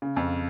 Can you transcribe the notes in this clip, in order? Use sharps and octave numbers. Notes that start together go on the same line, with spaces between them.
C#3
F2